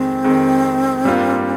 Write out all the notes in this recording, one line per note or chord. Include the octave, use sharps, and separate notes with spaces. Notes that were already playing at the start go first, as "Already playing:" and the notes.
Already playing: F2 D#3 G#3 C4
F2 D#3 G#3
G2 G3 A#3 F4